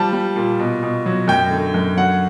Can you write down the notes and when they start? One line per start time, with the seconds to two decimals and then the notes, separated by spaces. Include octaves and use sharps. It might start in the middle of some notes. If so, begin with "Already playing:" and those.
Already playing: F3 G3 A5
0.13 G3
0.36 A#2
0.59 B2
0.83 B2
1.06 F#3
1.28 F#2 G5
1.51 D3
1.74 F#2
1.97 F#3 F#5